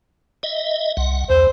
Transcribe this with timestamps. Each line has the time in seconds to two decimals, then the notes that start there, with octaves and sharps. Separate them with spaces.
0.43 D#5 E5
0.97 C2 F#5
1.30 E2 C5